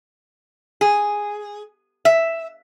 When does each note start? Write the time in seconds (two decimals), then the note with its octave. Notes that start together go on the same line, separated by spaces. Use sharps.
0.81 G#4
2.05 E5